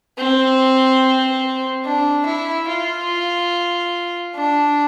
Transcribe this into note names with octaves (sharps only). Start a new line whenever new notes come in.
C4
D4
E4
F4
D4